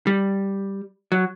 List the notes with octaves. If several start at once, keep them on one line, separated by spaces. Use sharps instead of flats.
G3
F#3